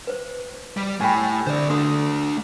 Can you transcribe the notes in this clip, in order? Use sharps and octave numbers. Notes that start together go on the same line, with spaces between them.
B4 C5
G3
A2 G4 G5 G#5 B5
D3 C5 D5
A3 D4 A4 C6 D#6